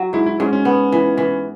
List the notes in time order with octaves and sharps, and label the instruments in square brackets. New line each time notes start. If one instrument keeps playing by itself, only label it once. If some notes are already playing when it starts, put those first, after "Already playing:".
Already playing: [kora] F#3
[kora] G#2 [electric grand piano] E4
[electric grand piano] E4
[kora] G#2 [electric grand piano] C#4
[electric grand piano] C#4
[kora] B3
E3
E3